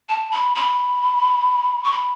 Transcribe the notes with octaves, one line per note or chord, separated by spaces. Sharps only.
A5
B5
B5
C#6
B5